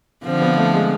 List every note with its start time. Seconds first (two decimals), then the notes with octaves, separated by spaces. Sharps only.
0.25 D3 F3 C4
0.42 B3
0.57 A3
0.74 G#3